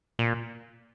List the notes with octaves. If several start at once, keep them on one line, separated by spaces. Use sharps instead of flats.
A#2